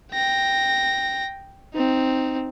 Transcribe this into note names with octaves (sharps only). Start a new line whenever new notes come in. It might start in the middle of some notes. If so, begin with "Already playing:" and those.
G5 A#6
C4 D#4